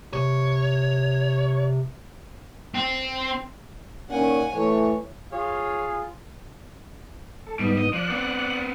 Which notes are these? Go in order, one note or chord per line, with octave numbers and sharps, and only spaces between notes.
C3 C#5
C4
A#2 D#3 C#4 F#5 G#5
E3 A3 C#5
F4 G#4 C#5 F5
A4
G#2 G3 B3 D#4
D#5
F3 D5 F#6
B3 C4